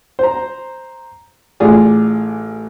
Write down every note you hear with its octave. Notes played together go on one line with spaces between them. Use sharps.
C5 A#5
A1 F4 G#4 D5